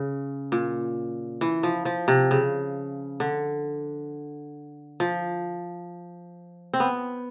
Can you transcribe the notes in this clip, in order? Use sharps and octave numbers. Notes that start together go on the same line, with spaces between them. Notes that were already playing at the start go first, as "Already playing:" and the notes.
Already playing: C#3
A#2
E3
F3
F3
C3
C#3
D3
F3
C4
B3